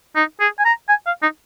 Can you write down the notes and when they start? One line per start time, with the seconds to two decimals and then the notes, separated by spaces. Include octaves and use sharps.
0.16 D#4
0.40 G#4
0.59 G#5
0.65 A#5
0.89 G#5
1.07 F5
1.22 D#4